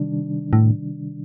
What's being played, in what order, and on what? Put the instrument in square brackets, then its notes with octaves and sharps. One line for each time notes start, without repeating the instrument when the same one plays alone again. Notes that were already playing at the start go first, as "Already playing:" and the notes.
Already playing: [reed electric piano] C3 D#3 G3 D4
[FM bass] A2